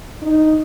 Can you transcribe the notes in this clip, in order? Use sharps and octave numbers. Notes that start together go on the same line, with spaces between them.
D#4